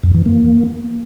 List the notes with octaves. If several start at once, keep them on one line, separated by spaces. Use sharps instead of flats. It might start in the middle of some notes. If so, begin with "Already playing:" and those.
F2
E3
A#3